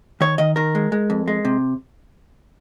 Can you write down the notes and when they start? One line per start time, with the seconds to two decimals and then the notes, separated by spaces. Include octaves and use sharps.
0.21 D#3 C#5
0.38 D#3 D#5
0.56 D#3 A#4
0.75 G#3
0.92 G#3
1.10 F2
1.28 G#3
1.45 C3